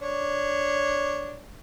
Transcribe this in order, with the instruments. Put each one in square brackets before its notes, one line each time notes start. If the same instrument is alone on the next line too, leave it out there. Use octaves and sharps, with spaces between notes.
[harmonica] D4 C#5